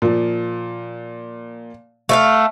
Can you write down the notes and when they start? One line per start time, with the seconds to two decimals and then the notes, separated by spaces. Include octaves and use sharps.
0.02 A#2 F3
2.09 A3 E5 F5